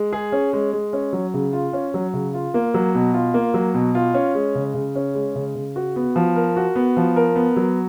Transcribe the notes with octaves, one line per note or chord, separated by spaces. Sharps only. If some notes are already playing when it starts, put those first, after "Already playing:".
Already playing: G#3
G#4
C#4
G#3
G#3
C#4
F#3
C#3
F4
C#4
F#3
C#3
F4
A#3
F#3
B2
F4
A#3
F#3
B2
F4
C#4
G#3
C#3
C#3
C#4
G#3
C#3
C#3
F#4
B3
F3
A#4
F#4
B3
F3
A#4
B3
F#3